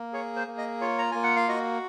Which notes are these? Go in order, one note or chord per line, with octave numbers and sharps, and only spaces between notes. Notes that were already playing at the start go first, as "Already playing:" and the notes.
Already playing: A#3
G#4 C#5
C5
A#3
D#5
F4 C#5
A#5
A#3 G#5
F#5
F5
F#4 D#5